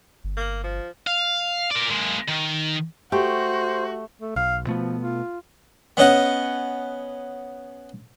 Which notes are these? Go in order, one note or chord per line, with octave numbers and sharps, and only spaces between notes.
G1
A#3
F3
F5
A#4 D5
G#3 A#3
D#3
A3 F#4 G4 C5
A3
B1 F5
B2 F3 A3 B3
F4
B3 C#4 D#5 F#5